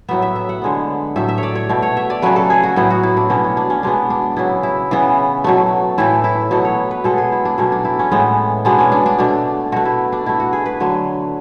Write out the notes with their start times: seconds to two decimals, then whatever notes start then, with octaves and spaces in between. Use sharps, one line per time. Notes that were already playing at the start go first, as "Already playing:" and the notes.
0.08 A2 F#3 B3 E5
0.22 E5
0.36 E5
0.49 F#5
0.62 D3 G#3 B3
1.16 A2 F#3 A3 E5
1.29 E5
1.38 C#5
1.43 D5
1.55 C#5
1.69 B2 A3
1.82 C#5
1.97 E5
2.10 D5
2.22 C#3 F#3 A3 B4
2.36 A4
2.50 G#4
2.63 F#4
2.76 A2 F#3 B3 E4
2.90 F#4
3.03 E4
3.17 D4
3.30 B2 F#3 B3 C#4
3.44 C#4
3.57 D4
3.70 C#4
3.83 B2 G#3 B3 D4
4.10 D4
4.36 C#3 F#3 B3 E4
4.63 E4
4.91 C#3 E3 B3
5.44 B2 F#3 A3
5.98 A2 E3 A3 E4
6.24 E4
6.51 B2 F#3 B3 A4
6.65 C#5
6.91 B4
7.04 B2 G#3 B3 A4
7.18 G#4
7.32 E4
7.45 D4
7.58 B2 F#3 A3 C#4
7.72 D4
7.85 E4
7.99 C#4
8.12 A2 E3 G#3 B3
8.65 B2 G#3 B3 D4
8.78 C#4
8.92 D4
9.06 D4
9.19 B2 A3 D4
9.72 B2 A3 F#4
9.85 E4
10.12 D4
10.26 B2 A3 E4
10.40 F#4
10.53 G#4
10.66 B4
10.80 D3 F#3 A3